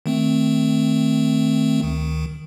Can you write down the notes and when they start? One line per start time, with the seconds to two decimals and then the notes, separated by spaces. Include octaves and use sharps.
0.06 D#3 A3 C4
1.83 D2 D#3